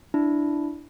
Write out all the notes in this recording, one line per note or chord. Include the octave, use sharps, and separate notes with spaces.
D4 E4